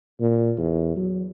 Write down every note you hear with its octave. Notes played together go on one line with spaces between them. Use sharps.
A#2
E2
F#3